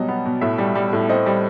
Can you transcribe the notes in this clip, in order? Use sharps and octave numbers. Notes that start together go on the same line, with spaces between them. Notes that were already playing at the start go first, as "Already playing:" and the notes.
Already playing: B2 F#3 G3 D#5
B3
B2
A2 E5
G3
G3
A2
C4 D#5
G3